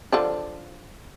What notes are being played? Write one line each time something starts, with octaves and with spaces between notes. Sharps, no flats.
D3 F3 D4